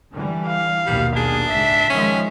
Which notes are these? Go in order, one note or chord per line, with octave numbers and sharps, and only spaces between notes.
D3 E3 G3
F5
A#1 D#2 B2 G3
D4 G#4
C#2 G#2 E5 B6
D#3 F3 G#3 C#4